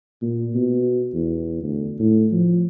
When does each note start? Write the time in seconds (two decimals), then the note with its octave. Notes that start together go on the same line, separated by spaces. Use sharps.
0.22 A#2
0.54 B2
1.13 E2
1.62 D2
1.99 A2
2.32 F3